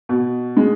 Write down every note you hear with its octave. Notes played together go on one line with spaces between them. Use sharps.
B2
G#3